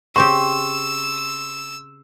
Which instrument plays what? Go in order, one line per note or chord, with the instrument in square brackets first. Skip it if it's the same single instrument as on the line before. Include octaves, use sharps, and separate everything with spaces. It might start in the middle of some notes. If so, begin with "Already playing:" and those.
[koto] C#3 C4 G4 [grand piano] C6 [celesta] C#6 [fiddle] E6